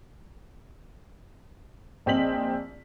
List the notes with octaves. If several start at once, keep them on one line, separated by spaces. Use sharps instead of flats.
A#1 C4 D#5 B6 F#7